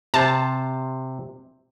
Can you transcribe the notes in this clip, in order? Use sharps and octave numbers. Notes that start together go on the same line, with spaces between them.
C3 C5 A5